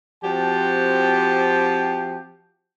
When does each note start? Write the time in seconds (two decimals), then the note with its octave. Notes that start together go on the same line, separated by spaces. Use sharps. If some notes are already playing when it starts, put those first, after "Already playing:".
0.23 F3 C4 F#4 G4 G5 A5